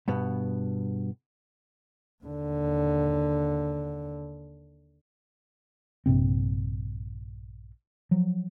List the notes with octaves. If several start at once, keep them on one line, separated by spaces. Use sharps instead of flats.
G2 B2 B3
D#2 D3
A#1 G2 C3 C4
F3 F#3